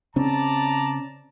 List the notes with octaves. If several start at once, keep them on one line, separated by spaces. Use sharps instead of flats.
C#3 C4 C#4 D5 A5 A#5